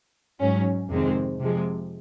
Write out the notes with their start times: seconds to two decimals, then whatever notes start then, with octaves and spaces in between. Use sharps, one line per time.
0.41 G#2 F#3 C#4
0.90 F2 C3 D#3 G#3 C4
1.40 C3 F3 G#3